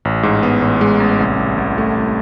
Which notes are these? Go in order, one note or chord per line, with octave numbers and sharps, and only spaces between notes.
A1
G#2
B3
A1
G#3
A1
C2
C2
C2
A3
C2